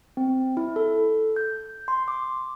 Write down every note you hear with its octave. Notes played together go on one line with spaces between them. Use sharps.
C4
E4
A4
G6
C6
D6